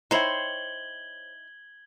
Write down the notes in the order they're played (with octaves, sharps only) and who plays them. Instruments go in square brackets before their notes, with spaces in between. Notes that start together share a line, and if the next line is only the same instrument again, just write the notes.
[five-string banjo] D#4 E4 G5 [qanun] C5 C#5 [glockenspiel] G#6 F#7 G7